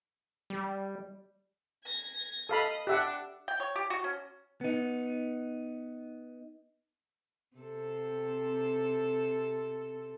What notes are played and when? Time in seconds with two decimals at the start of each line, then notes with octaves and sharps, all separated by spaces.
0.50 G3
1.84 G#6 A#6
2.49 A4 D#5 F5 B5
2.87 D4 G4 E5 F#5
3.48 G5
3.60 C#5
3.76 G4
3.90 F#4
4.04 C#4
4.61 B3 D#4
7.56 C3 C4 A4